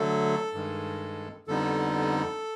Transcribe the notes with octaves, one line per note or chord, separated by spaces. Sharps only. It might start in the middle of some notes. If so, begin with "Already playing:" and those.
Already playing: D3 F#3 A3 A4
G2 D#3 G#3
F2 D3 G3 B3 D#4 A4